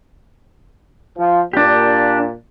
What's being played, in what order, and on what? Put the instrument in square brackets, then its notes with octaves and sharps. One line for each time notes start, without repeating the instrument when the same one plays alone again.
[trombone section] F3
[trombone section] A#2 [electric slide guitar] D4 G4